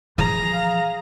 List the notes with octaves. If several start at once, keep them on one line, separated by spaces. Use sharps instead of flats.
E3 F3 G#4 A#5
F5